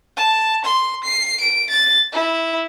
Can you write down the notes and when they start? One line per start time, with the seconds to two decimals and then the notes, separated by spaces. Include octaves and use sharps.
0.17 A5
0.65 C6
1.04 C7
1.40 D7
1.70 A6
2.13 E4